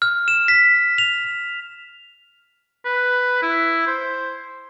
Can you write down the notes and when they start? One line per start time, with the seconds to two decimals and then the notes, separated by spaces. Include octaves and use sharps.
0.02 F6
0.28 E7
0.48 B6
0.98 F7
2.85 B4
3.42 E4
3.87 C5